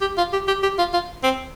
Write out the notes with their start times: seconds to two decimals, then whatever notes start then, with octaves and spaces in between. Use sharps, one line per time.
0.01 G4
0.18 F4
0.33 G4
0.48 G4
0.63 G4
0.79 F4
0.94 F4
1.23 C4